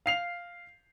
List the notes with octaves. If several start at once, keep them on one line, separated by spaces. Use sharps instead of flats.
F5 C7 F7